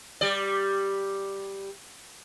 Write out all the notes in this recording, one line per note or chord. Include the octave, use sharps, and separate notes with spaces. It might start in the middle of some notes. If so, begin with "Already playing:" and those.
G3 D5